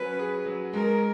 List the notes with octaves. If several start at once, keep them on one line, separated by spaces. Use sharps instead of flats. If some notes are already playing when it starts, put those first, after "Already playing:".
Already playing: F#3 C#4 B4
G#4
F#3
G#3 A#4